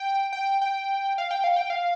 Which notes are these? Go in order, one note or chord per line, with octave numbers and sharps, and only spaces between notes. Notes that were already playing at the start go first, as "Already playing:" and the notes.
Already playing: G5
G5
G5
F5
G5
F5
G5
F5